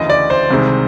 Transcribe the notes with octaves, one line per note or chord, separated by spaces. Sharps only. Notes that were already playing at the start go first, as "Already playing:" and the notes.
Already playing: D2 C#3 E3 D#5
D5
C5
C2 C3 D#3 G#3